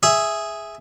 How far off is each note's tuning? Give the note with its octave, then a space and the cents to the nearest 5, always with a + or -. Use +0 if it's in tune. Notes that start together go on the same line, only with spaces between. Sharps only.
G#4 +0 E5 +0